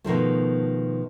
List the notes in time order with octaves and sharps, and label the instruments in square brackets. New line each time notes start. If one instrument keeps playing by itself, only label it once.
[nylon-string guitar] B2 D#3 F3 A3